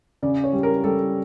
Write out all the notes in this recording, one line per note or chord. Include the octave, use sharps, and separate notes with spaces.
C#3 D5
C#5
G3
A#4
G3 A4